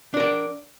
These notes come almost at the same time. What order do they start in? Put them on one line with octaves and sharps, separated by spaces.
D4 A#4 D5